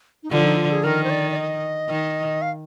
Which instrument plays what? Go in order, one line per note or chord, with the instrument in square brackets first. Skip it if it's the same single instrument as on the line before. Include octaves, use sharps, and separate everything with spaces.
[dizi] D#4
[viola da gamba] D3 F3 [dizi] F4
[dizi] D#4
F4
G#4
[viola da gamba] D#3 [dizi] A#4
[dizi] C5
D5
D5
D#5
[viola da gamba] D#3
[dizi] F5